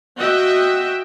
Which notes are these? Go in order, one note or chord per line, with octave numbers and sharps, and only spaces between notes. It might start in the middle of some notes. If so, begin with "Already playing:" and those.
F#4 D#5 E5 G5